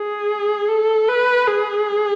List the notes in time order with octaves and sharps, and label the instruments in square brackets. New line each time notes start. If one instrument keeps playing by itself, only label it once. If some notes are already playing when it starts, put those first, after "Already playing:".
Already playing: [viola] G#4
A4
B4
G#4